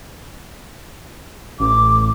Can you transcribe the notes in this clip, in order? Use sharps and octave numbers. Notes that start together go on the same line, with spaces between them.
A1 D6